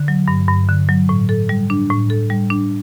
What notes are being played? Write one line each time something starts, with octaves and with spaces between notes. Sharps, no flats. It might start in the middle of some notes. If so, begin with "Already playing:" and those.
Already playing: D3
F#3
G2
G2
D3
F#3
A2
A4
G3
D4
A2
A4
G3
D4